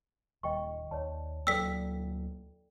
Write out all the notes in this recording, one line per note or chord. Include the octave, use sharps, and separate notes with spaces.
D#1 D#2 D#5 G5 C#6
D#2 C#5 D5 A5
D2 F#3 A#3 A4 D5 G5 E6 B6